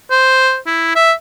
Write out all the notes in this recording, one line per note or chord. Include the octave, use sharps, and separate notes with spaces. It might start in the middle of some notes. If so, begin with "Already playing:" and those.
C5
E4
E5